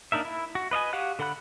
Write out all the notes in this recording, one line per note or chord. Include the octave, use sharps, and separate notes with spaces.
A#3 D4 D#4 A#4 E5
E4
F#4
B4 D#5 F5 G#5
F#4 G4 F5 F#5 F#6
D3 A4 F#5 B5 F#6